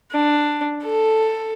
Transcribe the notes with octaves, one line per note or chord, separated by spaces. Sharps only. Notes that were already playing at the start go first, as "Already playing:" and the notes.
D4
A4